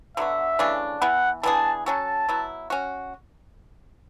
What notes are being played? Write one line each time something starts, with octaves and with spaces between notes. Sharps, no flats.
D3 F#3 B3 F#4 E5
C#3 E3 A3 D4
E3 B3 E4 F#5
E3 B3 D4 G#4 A5
F#3 C#4 F#4 A4 A5
F#3 B3 E4
C#4 F#4